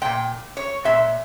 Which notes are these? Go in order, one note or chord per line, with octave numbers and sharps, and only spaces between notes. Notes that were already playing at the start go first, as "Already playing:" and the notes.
A#2 G#3 G5
C#5
A#2 G#3 E5